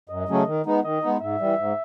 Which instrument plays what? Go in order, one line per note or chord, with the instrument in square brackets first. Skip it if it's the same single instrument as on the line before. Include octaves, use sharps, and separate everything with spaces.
[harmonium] F#2 [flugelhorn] D#5
[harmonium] C#3 F#3 A3 C#4
D#3
G#3 B3 D#4
[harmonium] D#3 [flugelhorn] D#5
[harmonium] G#3 B3 D#4
[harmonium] G#2 [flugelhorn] E5
[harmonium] E3 G3
G#2